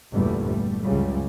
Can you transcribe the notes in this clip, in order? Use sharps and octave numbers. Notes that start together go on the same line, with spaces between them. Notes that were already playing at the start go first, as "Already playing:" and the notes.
G1 E2 A#2 G3 A3
G3 A3
C#2 F#2 C#3 G3